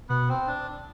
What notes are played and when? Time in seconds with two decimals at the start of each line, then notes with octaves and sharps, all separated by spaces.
0.09 B2 B3
0.29 C4
0.47 D4